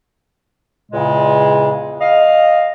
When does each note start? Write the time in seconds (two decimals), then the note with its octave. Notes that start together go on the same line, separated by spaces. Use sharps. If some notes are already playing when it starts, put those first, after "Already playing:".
0.92 E2 A#2 C#3 G#3
2.00 D#5 F5